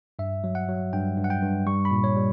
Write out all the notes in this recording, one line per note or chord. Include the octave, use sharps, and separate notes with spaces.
G2 E5
F#3
F#5
F#3
G2 G5
G2
F#5
G5
G2
G3 C#6
B5
A#2
C#5
G3